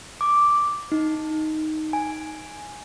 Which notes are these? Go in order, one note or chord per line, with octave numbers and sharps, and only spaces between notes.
D6
D#4
G#5